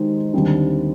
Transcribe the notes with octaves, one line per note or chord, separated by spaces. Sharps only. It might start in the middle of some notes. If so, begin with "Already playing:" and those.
Already playing: D#3 G#3 D#4 G4 C5
D#2 D3 G3 C4 D#4